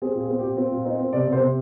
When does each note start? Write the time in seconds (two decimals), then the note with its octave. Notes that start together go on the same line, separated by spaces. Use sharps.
0.02 C4 G#4
0.15 A#2
0.20 G#4
0.29 C4
0.39 G4
0.44 A#2
0.57 C4 F4
0.72 A#2
0.85 C4 D#4
0.99 C4
1.13 C3 D5
1.28 C3
1.32 C5
1.41 C3